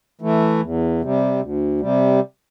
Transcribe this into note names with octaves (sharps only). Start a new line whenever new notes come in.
E3 A3
E2
C3 G3
D2
C3 G3